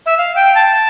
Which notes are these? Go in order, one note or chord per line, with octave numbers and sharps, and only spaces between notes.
E5
F5
G5
A5